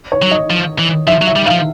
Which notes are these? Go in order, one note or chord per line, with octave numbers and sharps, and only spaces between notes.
C#5
F#3
D#5
F3
E3
F3 E5
F#3
E5
G3
F3 F5